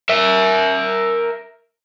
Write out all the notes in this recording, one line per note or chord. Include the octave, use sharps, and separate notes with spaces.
A#4 E5